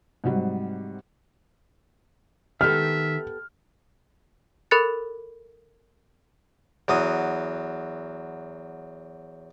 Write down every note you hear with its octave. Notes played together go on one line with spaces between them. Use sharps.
G#2 C3 F#3 G3
D#3 B3 G4 A4 E5 F6
A4 A#4 B5 F#6 A6 C#7
E2 F#3 D#6